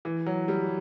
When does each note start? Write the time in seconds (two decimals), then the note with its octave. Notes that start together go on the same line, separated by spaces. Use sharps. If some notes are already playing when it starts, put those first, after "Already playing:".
0.05 E3
0.26 F#3
0.48 G3